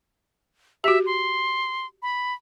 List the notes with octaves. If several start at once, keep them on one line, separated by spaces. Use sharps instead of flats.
F#4 G4 E5
C6
B5